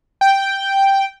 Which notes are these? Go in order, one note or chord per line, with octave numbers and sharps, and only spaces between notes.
G5